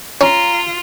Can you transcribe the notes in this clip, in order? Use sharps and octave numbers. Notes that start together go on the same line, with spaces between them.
C#4 F4 A#5